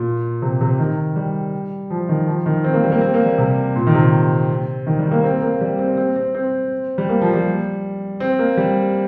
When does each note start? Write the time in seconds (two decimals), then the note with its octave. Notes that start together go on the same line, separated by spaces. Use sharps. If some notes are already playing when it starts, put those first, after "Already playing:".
Already playing: A#2
0.42 C3
0.61 C3
0.79 D#3
1.16 G3
1.90 F3
2.09 D#3
2.27 F3
2.46 D#3
2.64 C4
2.73 A#3
2.83 G3
2.92 A#3
3.01 C4
3.14 A#3
3.26 G3
3.38 C3
3.76 A#2
3.87 D#3
3.94 C3
4.87 D#3
4.99 G3
5.11 A#3
5.24 C4
5.42 A#3
5.61 G3
5.79 C4
5.98 C4
6.16 C4
6.35 C4
6.98 G3
7.09 A#3
7.21 F3
7.34 G3
8.20 C4
8.39 A#3
8.57 G3